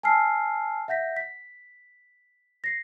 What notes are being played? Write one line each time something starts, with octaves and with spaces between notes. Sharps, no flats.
G#5 A5 E6 F6 C7
E5 F#5 G6 A#6 B6
B6
A#6 C7